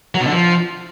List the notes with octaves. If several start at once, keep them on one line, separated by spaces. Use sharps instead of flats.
F#3
B2
D3
F3